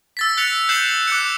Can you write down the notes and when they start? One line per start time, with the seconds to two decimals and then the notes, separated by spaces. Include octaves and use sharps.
0.17 E6 A6 B6
0.37 F#6 A6 B6 C#7 F7
0.69 F#6 G6 C7 E7 F#7
1.07 D6 F#6 G6 C#7